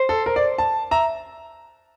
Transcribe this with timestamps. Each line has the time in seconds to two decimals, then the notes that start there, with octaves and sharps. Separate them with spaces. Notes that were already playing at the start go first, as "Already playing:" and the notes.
Already playing: C5
0.09 A4
0.26 A#4
0.36 D5
0.58 A5
0.91 E5 A#5